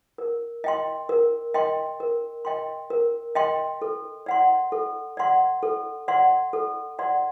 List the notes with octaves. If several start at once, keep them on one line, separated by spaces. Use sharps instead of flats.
A#4
D#5 G5 C6
A#4
D#5 G5 C6
A#4
D#5 G5 C6
A#4
D#5 G5 C6
A4
D5 F#5 C6
A4
D5 F#5 C6
A4
D5 F#5 C6
A4
D5 F#5 C6